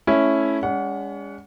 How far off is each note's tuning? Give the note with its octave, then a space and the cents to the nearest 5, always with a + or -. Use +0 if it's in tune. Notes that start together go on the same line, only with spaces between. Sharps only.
A3 -5 C#4 +0 E4 +0
G#3 -35 C#4 +40 F#5 +0